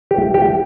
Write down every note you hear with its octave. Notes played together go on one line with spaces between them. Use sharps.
G4
G4